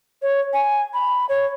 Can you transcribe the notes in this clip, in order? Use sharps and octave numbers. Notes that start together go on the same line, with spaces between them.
C#5
G#5
B5
C#5